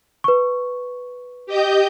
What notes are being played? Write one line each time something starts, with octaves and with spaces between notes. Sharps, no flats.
B4 C#6
G4 D#5 G6